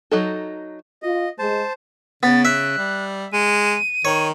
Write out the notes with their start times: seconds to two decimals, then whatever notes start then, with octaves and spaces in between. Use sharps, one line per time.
0.11 F#3 D#4 A4
1.02 F4 D#5
1.39 G#3 C5 A5
2.23 C#3 B3 A6
2.45 E5 F#6
2.78 G3
3.33 G#3 D#7
4.05 D#3 C#5